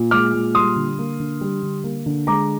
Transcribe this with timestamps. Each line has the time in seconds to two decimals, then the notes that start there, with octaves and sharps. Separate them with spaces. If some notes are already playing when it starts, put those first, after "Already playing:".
Already playing: A#2
0.11 G#3 D6 F6
0.34 A#2
0.55 G3 C6 D#6
0.76 D3
0.99 A#3
1.20 D3
1.41 G3
1.63 D3
1.84 A#3
2.06 D3
2.27 G#3 A#5 D6